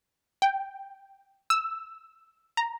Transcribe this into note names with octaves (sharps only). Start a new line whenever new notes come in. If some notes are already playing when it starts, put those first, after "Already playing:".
G5
E6
A#5